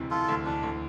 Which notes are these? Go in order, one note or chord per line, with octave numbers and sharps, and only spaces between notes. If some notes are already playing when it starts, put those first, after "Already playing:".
Already playing: E1 D2 C3 E3
E3 F4 A4
D2
E3 D4
D2